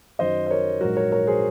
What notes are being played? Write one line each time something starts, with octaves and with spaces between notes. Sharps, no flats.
F#2 D#3 F#3 C5 D#5
C5
A#4 C#5
A#1 G#2 F#3 F#4 A#4
A#4 C#5
A#4 C#5
G#4 C5